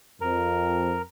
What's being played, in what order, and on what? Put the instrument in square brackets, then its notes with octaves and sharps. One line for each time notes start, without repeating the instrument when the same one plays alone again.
[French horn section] F2 [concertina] A#4